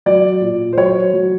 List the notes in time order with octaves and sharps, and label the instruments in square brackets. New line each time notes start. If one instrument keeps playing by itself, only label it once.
[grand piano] F#3 D5
A#2
C5
F#3 C#5
F#3